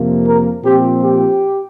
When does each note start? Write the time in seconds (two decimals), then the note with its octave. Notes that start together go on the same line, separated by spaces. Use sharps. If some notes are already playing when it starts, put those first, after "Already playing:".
Already playing: F2 C3 F3 A#3
0.27 A#4
0.64 A#2 F3 C4 G4
1.03 G4